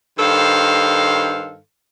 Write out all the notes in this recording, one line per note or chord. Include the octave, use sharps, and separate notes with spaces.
G2 D#3 A4 C5 F5